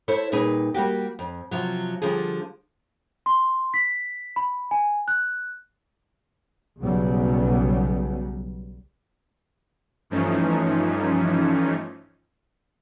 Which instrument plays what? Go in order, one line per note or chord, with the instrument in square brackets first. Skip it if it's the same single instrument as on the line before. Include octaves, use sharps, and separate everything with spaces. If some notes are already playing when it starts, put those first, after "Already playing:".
[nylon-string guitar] E4 A4 C5 C#5
A#2 G3 D#4 G#4 B4
G3 A#3 F#4 G4
F2
C3 F3 F#3
D3 F3 G3 G#4
[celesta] C6
B6
B5
G#5
F#6
[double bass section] B1 C#3 F#3 G3 B3
[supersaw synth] G2 E3 F3 A3 C#4 D#4